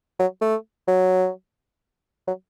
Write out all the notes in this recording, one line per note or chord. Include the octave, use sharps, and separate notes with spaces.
F#3
A3
F#3
F#3